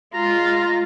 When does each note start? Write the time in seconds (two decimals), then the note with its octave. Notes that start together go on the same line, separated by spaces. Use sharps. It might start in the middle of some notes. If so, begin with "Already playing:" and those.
0.14 G#3 F4 A#5